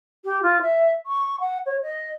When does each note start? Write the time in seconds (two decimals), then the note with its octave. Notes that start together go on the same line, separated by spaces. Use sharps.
0.25 G4
0.43 F4
0.62 E5
1.06 C#6
1.40 F#5
1.66 C#5
1.83 D#5